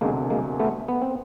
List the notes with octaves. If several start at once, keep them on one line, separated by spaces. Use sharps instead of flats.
E1 D2 C3 G#3 A#3
G#3 A#3
A3 B3
B3
C4